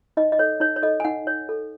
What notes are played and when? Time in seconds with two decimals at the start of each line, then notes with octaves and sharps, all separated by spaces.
0.17 D#4 D#5
0.32 D#5
0.39 A4 C#5
0.60 D#4 C#5
0.76 C#5
0.83 A4 D#5
1.00 G#5
1.04 D#4 F#5
1.27 C#5
1.49 A4